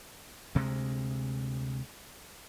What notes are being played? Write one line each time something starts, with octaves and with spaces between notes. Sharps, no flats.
D2 C3 G#3